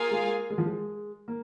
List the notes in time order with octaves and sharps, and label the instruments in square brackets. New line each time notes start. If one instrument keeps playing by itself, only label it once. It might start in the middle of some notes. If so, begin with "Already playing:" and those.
Already playing: [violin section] A#3 F4 G#4 F5 G#5
[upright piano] G#3
G#3
F3
G#3
A#3